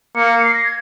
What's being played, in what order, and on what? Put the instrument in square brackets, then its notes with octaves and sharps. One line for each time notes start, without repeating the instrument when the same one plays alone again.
[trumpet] A#3 [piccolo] C#7
[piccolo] C#7
C7
A#6
G#6